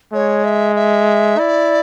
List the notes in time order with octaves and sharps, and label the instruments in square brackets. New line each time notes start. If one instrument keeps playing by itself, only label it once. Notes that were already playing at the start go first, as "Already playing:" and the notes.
[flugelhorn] G#3 [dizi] C#5
[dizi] E5
E5
[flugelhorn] E4 [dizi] D5